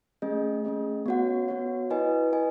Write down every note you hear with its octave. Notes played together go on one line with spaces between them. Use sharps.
A3 C#4 G#4 D#5
A3 C#4 G#4 D#5
B3 F#4 C#5 F#5
B3 F#4 C#5 F#5
E4 B4 D#5 G#5
E4 B4 D#5 G#5